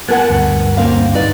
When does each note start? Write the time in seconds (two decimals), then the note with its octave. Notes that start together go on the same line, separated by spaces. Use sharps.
0.08 B3 A#4 F#5 G#5 A5 F#6
0.30 D2 G2
0.77 A#3 C4 F5
1.14 D#4 B4 D5